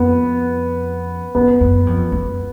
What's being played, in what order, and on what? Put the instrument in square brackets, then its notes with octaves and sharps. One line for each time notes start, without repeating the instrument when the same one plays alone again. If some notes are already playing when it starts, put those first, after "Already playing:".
Already playing: [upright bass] F2 [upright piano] B3
[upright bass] F#2 [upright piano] B3
[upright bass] F#2
F2
F#2